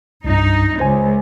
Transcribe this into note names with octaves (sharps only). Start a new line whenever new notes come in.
C2 G2 D#4
C#2 C5 G#5